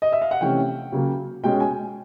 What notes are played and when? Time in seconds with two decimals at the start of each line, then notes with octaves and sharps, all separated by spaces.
0.02 D#5
0.12 E5
0.21 F5
0.31 F#5
0.41 C3 E3 A3 C#4 G5
0.92 C#3 F#3 A#3
1.43 B2 G#3 C#4 G5
1.60 G#5